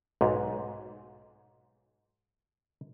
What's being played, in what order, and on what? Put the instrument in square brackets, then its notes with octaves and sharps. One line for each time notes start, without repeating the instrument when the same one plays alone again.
[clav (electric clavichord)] B1 G#2